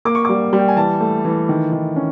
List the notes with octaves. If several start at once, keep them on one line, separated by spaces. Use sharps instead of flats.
A#3 D6
C#6
G3 D6
G3
G5
G#5
E3 A5
A3
E3
D#3
D#3
C#4